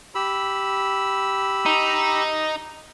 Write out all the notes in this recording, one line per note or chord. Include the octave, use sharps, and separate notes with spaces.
G4 B5 E6
D#4